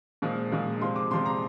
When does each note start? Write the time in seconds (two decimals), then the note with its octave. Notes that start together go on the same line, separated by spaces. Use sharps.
0.22 A#2 F3 G#3
0.52 A#2 F3 G#3
0.81 C3 F3 G#3 C6
0.96 D6
1.11 C3 F3 G#3 C6
1.25 A#5